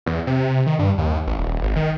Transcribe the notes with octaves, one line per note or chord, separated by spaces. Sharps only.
E2
C3
D#3
G2
D#2
A1
D#1
G#1
D#3